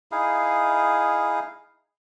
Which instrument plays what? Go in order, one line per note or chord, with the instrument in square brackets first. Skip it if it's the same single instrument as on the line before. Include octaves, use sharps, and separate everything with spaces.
[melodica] D#4 E4 G#4 F5